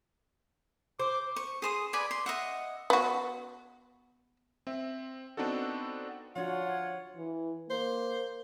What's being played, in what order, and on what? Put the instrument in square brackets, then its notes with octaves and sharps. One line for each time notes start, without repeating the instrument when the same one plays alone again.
[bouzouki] C5 [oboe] D6
[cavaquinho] C#6
G#4 C5 D#6
B4 D5 G#5 B5
C6
D#5 E5 F#5
[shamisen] B3 F#4
[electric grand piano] C4 E5
B3 C4 D4 D#4 F#4 A4
[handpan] F3 D4 F#4 [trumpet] F4 [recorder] C#5 [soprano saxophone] F#5
[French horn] E3
[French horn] A#3 [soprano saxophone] C5